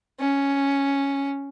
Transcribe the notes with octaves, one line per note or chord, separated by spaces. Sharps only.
C#4